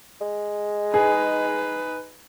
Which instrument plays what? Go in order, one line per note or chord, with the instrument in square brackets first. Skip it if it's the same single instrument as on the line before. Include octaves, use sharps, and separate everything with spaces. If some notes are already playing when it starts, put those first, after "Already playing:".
[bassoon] G#3
[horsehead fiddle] D#4 B4 [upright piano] G#4